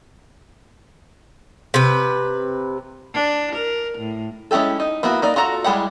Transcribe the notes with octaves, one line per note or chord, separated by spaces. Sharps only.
C3 B4
D4
A#4
A2
G#3 C#4 E4 G4 A4
D#4
A#3 B3 E4 F#4
A#3 D#4 D5
F4 F#4 A4 A#5
G3 G#3 E4 G4 F#5